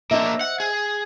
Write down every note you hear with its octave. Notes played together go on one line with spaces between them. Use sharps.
A#3 D4 C5 D#5 E5
F#5
G#4